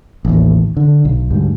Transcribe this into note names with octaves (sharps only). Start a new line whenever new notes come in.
A1 D#2
D3
B1
D2 G#2 G3